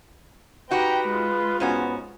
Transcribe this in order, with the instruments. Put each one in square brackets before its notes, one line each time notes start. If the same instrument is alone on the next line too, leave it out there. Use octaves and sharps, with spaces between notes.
[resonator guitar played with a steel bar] D#4 F#4 G4 [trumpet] B4 [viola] G5 A#5
[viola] G#3 F4
[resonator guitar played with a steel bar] G#2 C#4 F#4 [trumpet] B3